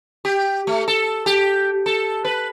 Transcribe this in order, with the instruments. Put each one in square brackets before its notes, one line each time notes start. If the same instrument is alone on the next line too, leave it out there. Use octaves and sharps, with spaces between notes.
[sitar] G4
A3
A4
G4
A4
B4